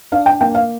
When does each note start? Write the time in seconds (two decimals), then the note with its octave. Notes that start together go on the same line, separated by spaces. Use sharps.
0.12 D4 F5
0.26 G5
0.41 A#3 G5
0.55 F5